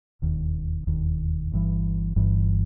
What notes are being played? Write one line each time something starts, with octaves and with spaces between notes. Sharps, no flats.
E1 D#2 D#3
E1 D#2 D#3
G1 G2 E3
G1 G2 E3